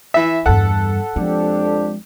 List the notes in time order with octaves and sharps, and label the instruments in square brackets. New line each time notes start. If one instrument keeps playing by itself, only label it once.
[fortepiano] E3 E5
[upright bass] E2 G2 [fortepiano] A4 F#5
[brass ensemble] F2 D4 G4 [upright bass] F3 G#3